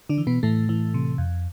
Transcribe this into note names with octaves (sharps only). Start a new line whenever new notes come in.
D3 D4
E3
B2 B3
A2 E3 A3
E3
C3
F2